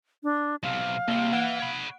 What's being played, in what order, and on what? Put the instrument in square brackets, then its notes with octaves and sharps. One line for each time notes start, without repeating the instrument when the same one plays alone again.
[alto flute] D4
[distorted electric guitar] B1 C3 [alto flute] F5
[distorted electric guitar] C2 C3 [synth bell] A#3 G7
[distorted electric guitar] E3 [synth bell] F#5 F#6 D7
[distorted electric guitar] C#5 B5